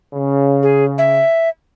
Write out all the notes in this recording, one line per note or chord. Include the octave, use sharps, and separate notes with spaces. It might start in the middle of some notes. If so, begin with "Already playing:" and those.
C#3
G#4
E5